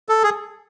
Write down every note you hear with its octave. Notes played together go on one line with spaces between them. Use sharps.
A4
G#4